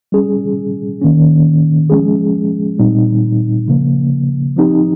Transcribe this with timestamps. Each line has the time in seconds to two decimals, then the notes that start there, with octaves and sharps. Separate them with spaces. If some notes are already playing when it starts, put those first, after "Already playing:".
0.12 G3 C#4 G#4
1.01 D#3 A#3 C#4
1.90 F3 G#3 C#4 G#4
2.79 A#2 G3 C4 D#4
3.68 C#3 F3 A#3
4.57 F3 C4 D#4 G4